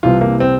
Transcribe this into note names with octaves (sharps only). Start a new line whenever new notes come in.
C2 C3 E3 F4
A#3
C4